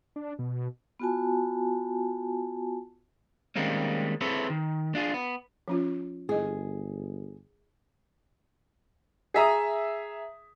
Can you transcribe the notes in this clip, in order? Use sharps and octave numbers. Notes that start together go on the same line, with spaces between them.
D4
B2
B3 F4 F#4 G#5 A5
D#3 G3 G#3 A#3 C4 C#4
C4 E4 G#4 A4 B4 C#5
D#3
D4 F4 G#4
B3
F3 C#4 F4
G1 E4 G#4 D#5
G#4 E5 A#5 D#6